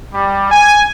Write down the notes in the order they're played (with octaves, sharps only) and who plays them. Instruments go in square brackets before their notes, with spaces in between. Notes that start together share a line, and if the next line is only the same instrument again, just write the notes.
[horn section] G3
G#5